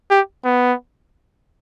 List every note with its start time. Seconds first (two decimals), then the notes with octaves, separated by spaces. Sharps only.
0.11 G4
0.44 B3